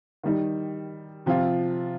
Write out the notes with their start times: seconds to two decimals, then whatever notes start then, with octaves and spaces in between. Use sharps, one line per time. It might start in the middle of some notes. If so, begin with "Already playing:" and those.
0.23 D#3 G3 D#4
1.26 C3 F3 C4 F4